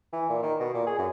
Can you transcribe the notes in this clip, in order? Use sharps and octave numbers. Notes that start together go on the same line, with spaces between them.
E3
A#2
D#3
B2
A#2
G#4
F#2